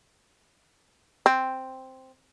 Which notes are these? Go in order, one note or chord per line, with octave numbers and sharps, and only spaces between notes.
C4